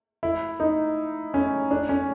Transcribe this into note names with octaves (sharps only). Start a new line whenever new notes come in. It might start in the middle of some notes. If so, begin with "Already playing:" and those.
E4
D#4
C#4
D4
C#4